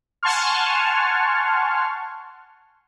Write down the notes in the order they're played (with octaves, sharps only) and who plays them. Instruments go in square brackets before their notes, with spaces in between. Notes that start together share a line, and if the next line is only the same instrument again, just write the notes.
[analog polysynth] F#5 G#5 A5 C6 C#6 F6